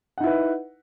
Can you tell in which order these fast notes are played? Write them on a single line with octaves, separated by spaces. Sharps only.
F#5 D#4 E4 B4